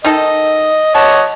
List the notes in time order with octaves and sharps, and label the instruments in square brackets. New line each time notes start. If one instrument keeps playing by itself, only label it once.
[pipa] D#3 D#4 A4 [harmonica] D#5
[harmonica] C#5 D#5 F#5 [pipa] A5